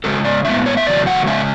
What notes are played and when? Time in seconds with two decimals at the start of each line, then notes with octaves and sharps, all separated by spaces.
0.04 C#3 G#3 C#4 A4
0.25 D5
0.45 A2 G#3 B3 E5
0.66 C#5
0.77 E5
0.86 E2 C#3 F#3 A3 D5
1.07 F#5
1.27 C#3 G#3 C#4 E5